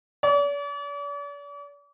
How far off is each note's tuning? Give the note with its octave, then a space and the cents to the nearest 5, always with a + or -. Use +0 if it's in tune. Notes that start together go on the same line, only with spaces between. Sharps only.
D5 -45